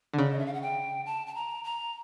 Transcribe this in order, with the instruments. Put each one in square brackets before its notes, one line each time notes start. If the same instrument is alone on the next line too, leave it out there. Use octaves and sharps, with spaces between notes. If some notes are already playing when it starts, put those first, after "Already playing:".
[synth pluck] D3
[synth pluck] C#3 [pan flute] D5
[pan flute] D#5
E5
F5
F#5
G5
A5
A5
A#5
A#5